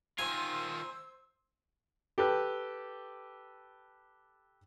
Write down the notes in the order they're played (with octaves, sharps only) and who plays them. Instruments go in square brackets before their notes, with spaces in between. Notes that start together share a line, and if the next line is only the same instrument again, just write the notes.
[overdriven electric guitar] D#3 F4 [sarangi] C5 [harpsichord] G#5 [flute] E6
[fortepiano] G4 A4 B4